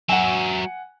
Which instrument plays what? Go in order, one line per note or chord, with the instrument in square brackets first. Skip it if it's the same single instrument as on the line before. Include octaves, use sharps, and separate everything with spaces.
[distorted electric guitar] F#3 E5 [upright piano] F#5 G#5